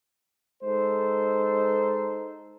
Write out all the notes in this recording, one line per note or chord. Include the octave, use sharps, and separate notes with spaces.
G#3 D#4 A4 C5